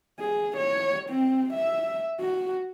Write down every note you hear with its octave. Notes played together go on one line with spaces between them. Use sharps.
G#4
C#5
C4
E5
F#4